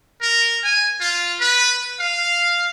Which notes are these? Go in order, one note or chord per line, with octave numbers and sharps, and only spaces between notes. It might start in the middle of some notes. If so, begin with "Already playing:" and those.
A#4
G#5
F4
B4
F5